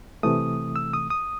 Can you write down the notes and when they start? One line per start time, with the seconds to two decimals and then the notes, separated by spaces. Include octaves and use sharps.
0.23 C3 E3 A3 D#6
0.76 E6
0.93 D#6
1.10 D#6